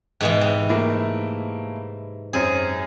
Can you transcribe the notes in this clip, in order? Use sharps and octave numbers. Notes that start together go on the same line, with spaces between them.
G#2 B2 E3
C3
A3 A#3 E4
F#2 C4 G#4